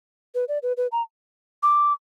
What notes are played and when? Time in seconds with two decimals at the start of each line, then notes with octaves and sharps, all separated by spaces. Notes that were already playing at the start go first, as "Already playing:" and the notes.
0.35 B4
0.48 D5
0.63 B4
0.77 B4
0.92 A#5
1.63 D6